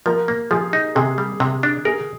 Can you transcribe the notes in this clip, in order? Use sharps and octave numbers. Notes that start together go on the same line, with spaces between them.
F3 A#4
A#3
F3 G#4
D#4
C3 G#4
G3
C3
D4
G#4 A#4